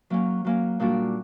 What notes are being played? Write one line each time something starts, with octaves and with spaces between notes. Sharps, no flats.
F#3 A#3 C#4
F#3 A#3 C#4
A#2 G3 A#3 D4 F#4